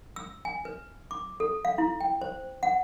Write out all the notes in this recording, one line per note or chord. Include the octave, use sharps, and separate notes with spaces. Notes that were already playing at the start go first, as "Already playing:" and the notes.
E6
G#5
B4
D6
A4
F5
E4
G5
C5
F#5